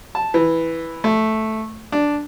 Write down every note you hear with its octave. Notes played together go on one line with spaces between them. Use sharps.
A5
E3
A3
D4